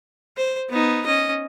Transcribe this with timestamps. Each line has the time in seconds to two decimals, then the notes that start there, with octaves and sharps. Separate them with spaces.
0.37 C5
0.70 B3 D#4
1.06 C#4 D#5